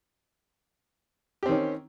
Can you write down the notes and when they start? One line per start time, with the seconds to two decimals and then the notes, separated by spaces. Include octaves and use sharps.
1.43 G4
1.46 C4
1.49 D#3
1.52 C#4